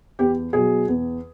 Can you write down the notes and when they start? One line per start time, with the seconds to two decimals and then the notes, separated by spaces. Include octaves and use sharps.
0.19 E2 G4
0.53 B2 F#3 G#4
0.88 E2